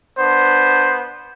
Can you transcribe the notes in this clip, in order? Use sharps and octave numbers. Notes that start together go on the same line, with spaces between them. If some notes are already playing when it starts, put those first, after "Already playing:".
B3 D4 C5